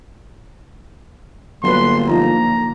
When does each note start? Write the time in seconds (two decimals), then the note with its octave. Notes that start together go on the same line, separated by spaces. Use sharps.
1.63 G1 D3 F#3 A#3 B4 C6
2.09 F3 D#4 F4 A#5